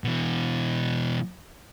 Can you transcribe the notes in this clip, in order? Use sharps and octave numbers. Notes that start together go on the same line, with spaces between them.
B2 E3